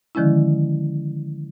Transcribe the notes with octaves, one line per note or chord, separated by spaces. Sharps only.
D3 D#3 F3 G#3 C#4 E4